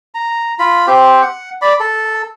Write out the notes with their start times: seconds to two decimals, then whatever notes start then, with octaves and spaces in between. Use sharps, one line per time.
0.14 A#5
0.59 F4 B5
0.87 C4 G4 C5
1.22 F#5
1.61 D5 B5
1.80 A4